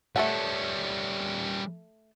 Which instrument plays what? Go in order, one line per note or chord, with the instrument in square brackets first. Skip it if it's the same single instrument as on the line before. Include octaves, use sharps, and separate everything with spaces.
[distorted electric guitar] G3 C#4 [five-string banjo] A3 A4 F#5